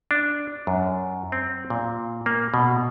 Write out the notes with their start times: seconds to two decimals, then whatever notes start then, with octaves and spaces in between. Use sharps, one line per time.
0.11 D4
0.67 F#2
1.32 C4
1.70 A#2
2.26 A#3
2.54 B2